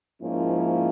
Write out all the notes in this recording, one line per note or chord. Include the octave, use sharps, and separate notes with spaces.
G#2 F3 A#3 C#4 E4